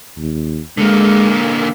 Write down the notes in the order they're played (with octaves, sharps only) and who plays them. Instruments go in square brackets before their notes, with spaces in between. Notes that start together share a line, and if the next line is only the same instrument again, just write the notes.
[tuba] D#2
[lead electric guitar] D3 A#3 [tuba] G#3